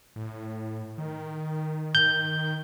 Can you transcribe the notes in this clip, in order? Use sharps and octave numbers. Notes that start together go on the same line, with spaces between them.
A2
D#3
G6